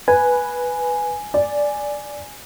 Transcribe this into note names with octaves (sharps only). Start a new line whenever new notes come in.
B4 G#5
D5